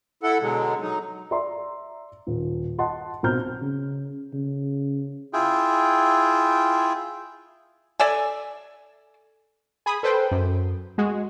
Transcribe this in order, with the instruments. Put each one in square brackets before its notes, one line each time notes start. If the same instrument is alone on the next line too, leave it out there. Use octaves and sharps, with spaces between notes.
[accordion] E4 A4 F#5
B2 D3 F#3 G#3
F#3 D#4
[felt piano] D5 E5 A#5 C6
D#1
D#5 F#5 A5 C6
B1 C4 A#5 F6 G6
[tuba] C#3
C#3
[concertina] E4 F4 G#4 G5
[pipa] A4 D5 E5 G#5
[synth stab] G#4 B5 D#6
A4 B4 C5 G5
F#2
G#3 F#4 G#4